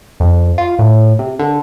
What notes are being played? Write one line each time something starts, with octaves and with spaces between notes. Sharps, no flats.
F2
F4
A2
C3
D3